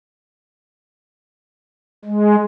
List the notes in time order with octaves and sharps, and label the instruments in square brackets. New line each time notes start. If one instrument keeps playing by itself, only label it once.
[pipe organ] G#3